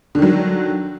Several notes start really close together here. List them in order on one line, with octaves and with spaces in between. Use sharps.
D3 D#3 F#3